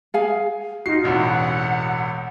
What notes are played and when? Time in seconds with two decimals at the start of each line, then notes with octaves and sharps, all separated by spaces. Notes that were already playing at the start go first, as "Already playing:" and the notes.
0.14 G#4 F5 G#5
0.86 D#4 F4 F#4 C7
1.03 E1 A1 E2 F#5